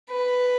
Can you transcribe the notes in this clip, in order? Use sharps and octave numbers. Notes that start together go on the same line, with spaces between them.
B4